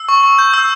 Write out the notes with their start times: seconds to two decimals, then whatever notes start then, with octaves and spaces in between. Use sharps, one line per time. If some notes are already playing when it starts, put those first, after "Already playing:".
Already playing: E6
0.09 C#6
0.23 C#6
0.39 G6
0.54 E6